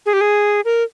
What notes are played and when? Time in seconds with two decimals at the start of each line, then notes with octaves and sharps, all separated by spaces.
0.06 G#4
0.13 G4
0.21 G#4
0.65 A#4